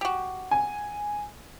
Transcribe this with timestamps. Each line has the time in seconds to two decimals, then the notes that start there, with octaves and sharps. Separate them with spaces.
0.01 F#4 G4
0.51 G#5